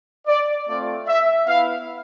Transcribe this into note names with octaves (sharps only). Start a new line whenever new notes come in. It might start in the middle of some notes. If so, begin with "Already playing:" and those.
D5
A3 C4 F4 D5
E5
B3 E4 F5